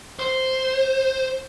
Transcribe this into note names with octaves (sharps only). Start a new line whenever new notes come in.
C5